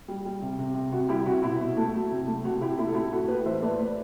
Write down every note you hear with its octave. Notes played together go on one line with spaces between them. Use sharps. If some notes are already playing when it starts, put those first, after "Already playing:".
G3
G3
C3
C3
C3
C3 F#4
G3 E4 G4
C3 F#4
B2 E4
B2
A3
F#3
C3
A3
C3 F#4
C3 E4 G4
A3 E4 G4
A4
A2 E4 G4
F#3 F#4 A4
A3 G4 B4
E3 C5 E5
A3 B4 D5
A3 B4 D5